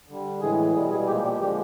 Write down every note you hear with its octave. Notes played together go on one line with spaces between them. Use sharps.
D3 G3
A2 E3 G#3 G#4
B2 G3 G#4
G#4
A#2 F3 G#3 G4
G4
D3 F3 G#3 G4